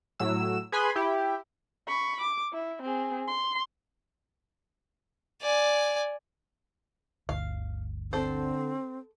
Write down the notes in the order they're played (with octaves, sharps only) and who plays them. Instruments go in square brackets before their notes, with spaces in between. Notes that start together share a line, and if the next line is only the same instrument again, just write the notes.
[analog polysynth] A2 F#3 E6
G#4 B4 G#5 B5 C6
E4 G4
[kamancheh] B5 C#6
D6
E4
C4 G#4
C6
[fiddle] D5 G#5
[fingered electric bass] G1 D2 [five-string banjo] F5
[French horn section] D3 [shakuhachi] C4 [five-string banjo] A4 C5